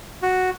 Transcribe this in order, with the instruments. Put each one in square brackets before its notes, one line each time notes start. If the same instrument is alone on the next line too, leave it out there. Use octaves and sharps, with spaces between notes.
[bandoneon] F#4